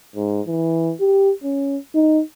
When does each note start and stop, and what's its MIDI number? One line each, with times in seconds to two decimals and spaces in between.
0.16 0.41 44
0.47 0.93 52
1.01 1.32 67
1.43 1.77 61
1.95 2.21 63